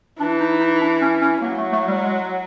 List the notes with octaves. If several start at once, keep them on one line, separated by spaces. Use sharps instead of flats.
E3 D4
D#4
D#4
D4
C#4
C#4
F#3 A#3
A3
A3
G3
G#3